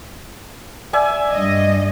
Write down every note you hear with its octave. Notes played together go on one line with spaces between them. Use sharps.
D5 E5 G#5
G2 D#5